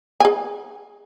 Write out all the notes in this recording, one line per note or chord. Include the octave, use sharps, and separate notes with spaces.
G#4 G#5